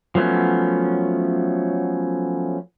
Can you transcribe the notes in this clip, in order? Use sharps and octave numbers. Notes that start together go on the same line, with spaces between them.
F3 F#3 A3 B3 C#4